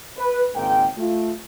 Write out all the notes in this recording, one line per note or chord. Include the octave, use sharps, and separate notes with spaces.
B4
G#1 C#2 G#2 A#3 A#4 G5
A3 F4